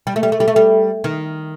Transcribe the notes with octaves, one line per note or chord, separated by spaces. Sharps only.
G3
A3
G3
A3
G3
A3
G3
D#3